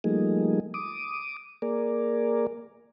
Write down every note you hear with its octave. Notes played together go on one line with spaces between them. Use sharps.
F3 G3 A3 A#3 D#4 G#4
D6 D#6
A#3 G#4 A#4 D5